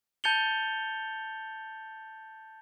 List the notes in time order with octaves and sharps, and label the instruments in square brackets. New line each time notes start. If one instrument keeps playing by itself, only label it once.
[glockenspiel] A5 G6 A6 C#7 F7 G7